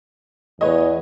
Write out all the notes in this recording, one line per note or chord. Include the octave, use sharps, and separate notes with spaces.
E2 B4 C#5 D#5